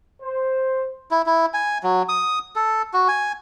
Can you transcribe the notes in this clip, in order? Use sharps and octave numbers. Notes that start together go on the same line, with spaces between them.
C5
E4
E4
G#5
F#3
D#6
A4
F#4
G#5